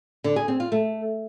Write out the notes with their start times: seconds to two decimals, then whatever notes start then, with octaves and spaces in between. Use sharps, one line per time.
0.24 D3
0.36 G#4
0.48 C4
0.60 F4
0.72 A3